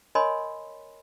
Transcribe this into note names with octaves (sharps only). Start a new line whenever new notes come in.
A#4 C#5 D#5 G#5 B5 C6